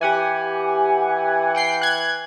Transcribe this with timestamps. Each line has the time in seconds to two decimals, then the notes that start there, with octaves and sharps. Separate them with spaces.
0.01 E3 G4 F#5 G#5
1.55 F#5 G5 C7
1.82 F#6 G#6